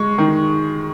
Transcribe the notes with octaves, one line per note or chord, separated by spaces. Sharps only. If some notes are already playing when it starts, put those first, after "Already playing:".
Already playing: G#3 C#6
D#3